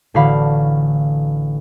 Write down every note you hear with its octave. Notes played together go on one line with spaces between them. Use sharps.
A1 D3 F#4 F5 B5